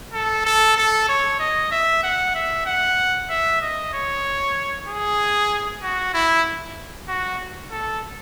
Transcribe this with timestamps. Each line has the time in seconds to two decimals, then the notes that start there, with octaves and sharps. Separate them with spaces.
0.13 A4
0.45 A4
0.77 A4
1.09 C#5
1.40 D#5
1.72 E5
2.03 F#5
2.35 E5
2.66 F#5
3.30 E5
3.61 D#5
3.93 C#5
4.87 G#4
5.82 F#4
6.14 E4
7.08 F#4
7.71 A4